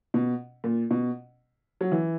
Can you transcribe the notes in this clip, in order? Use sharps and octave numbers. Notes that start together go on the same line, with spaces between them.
B2
A#2
B2
F#3
E3